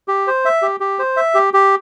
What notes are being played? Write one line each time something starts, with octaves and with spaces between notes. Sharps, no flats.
G4
C5
E5
G4
G4
C5
E5
G4
G4